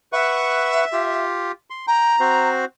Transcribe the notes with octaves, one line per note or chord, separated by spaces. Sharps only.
B4 E5 F#5 C#6
F4 G4
C6
G5 A#5
C4 F#4 C5